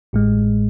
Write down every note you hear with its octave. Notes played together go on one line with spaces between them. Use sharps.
A1 A2 G#3